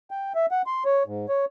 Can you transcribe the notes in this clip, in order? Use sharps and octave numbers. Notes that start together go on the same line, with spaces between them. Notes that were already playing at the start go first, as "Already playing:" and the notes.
G5
E5
F#5
C6
C#5
G#2
C#5